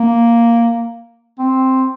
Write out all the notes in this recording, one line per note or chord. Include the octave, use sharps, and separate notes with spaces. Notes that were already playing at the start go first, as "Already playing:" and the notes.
Already playing: A#3
C4